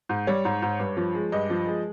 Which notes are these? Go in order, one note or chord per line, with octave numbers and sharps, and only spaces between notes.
G#2
G3 C#5
G#2
G#2
G2
F3
G#3
G2 D#5
F3
G#3